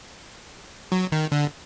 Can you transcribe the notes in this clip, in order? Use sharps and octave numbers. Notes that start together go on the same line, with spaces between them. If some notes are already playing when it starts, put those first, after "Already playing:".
F#3
D#3
D3